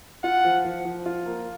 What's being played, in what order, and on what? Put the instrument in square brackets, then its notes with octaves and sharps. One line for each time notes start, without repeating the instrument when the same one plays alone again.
[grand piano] F4 [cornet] F#5
[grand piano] F3
F3
F3
F4
A#3